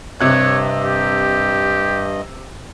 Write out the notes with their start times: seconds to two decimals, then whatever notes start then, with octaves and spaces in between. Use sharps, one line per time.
0.21 G2 C3 C#5 D#5 F#6
0.84 G4